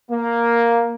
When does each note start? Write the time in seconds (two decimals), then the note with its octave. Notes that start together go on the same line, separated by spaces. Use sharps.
0.11 A#3